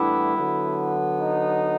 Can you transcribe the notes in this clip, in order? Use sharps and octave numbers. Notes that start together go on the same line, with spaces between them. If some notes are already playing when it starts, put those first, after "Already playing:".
Already playing: A2 E3 G3 B3 D4 E4
D3 F#3 B3
D#4